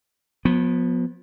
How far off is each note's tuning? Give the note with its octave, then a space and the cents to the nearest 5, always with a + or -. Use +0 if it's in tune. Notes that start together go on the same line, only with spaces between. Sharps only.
F3 +40 B3 -10